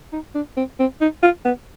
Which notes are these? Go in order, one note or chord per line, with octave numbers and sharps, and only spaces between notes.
D#4
D4
C4
C4
D#4
F4
B3